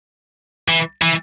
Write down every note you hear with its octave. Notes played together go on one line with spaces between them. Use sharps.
E3
E3